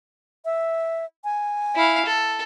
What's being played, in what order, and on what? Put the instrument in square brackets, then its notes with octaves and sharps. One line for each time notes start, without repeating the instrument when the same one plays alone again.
[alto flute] E5
G#5
[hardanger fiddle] E4 F5
A4